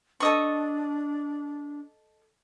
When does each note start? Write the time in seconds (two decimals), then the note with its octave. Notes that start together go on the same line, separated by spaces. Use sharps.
0.20 D4 A4 D#5 C#6